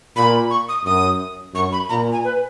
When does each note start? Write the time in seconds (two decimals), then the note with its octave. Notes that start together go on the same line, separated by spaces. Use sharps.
0.16 A#2 B5
0.50 C#6
0.69 D#6
0.85 F#2 D#6
1.54 F#2 C#6
1.72 B5
1.89 A#2 A#5
2.12 G#5
2.24 B4